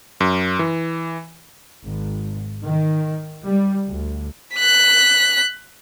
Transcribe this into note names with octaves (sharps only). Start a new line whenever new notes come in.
F#2
E3
G#1
D#3
G3
D2
F#6 B6